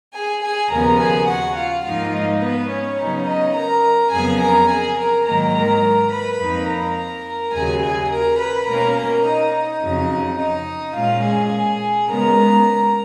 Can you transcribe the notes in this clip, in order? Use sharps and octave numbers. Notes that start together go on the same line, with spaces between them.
G#4 G#5
G#4 G#5
D#2 C#3 F3 B3 A#4 A#5
G#4 G#5
F#4 F#5
F4 F5
G#2 F3 A#3 D#4 F4 F5
D#4 D#5
B3 B4
C#4 C#5
C#3 F#3 B3 D#4
D#4 D#5
A#4 A#5
F2 C#3 F#3 B3 G#4 G#5
A#4 A#5
G#4 G#5
A#4 A#5
G#2 D#3 F#3 A#3 A#4 A#5
A#4 A#5
B4 B5
F2 F3 A#3 D#4
A#4 A#5
D#2 C#3 F#3 G#4 G#5
G#4 G#5
A#4 A#5
B4 B5
B2 A#3 C#4 A#4 A#5
A#4 A#5
D#4 D#5
D#4 D#5
F2 C#3 F#3
D#4 D#5
A#2 G#3 C#4 F4 F5
G#4 G#5
C#3 G#3 B3 A#4 A#5